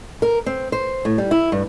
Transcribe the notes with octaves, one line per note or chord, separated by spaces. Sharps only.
A#4
C4
C5
A2
G3
E4
G2